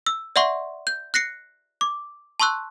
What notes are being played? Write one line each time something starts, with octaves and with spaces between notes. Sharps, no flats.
E6
D5 E5 F#5 C6 C#6
G6
F#6 A#6 C7 C#7
D6
A5 C6 C#6 E6 F#6